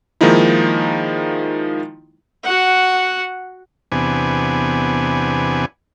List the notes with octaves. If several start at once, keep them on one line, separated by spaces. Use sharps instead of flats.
D#3 F3 G#3 A#3 D#4 E4
F#4 F#5
E2 C3 B3 D4 G#5